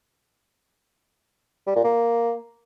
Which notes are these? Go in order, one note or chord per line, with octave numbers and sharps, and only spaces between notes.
G3
A#2
A#3